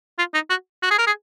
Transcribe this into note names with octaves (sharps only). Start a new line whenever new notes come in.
F4
D#4
F#4
F#4
G#4
A#4
G#4